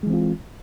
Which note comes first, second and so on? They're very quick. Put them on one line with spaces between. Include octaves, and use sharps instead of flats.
G#3 E3 C4 F4